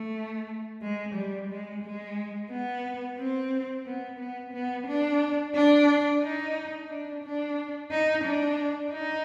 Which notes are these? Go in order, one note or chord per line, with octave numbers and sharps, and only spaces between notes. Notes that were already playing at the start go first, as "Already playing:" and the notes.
Already playing: A3
G#3
G3
G#3
G#3
B3
C4
B3
B3
B3
D4
D4
D#4
D4
D4
D#4
D4
D#4